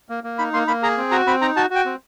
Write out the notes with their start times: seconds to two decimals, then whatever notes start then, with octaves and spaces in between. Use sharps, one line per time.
0.09 A#3
0.24 A#3
0.38 D#4 B5
0.53 A#3 C6
0.68 A#3 B5
0.83 G#4 A#5
0.98 C4
1.11 F#4 A#5
1.27 C4 B5
1.42 D#4 A#5
1.56 F#4 A5
1.70 F#4 G5
1.85 C4